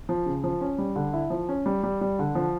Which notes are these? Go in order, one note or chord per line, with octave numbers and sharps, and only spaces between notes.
F3
C#3
F3
C#4
G3
D3
E4
F3
C#4
G3
G3
G3
D3
F3